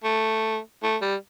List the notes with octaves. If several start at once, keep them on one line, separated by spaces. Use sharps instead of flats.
A3
A3
G3